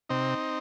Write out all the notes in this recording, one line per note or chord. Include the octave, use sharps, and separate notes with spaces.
C3 C4 D#4